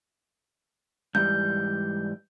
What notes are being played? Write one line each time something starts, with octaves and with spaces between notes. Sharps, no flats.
G#2 E3 G3 G6